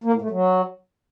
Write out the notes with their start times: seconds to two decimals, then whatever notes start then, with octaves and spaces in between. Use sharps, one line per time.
0.04 A#3
0.13 A2
0.22 A3
0.30 F#3